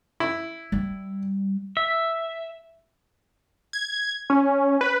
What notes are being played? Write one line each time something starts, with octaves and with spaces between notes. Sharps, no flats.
E4
G3
E5
G#6
C#4
B4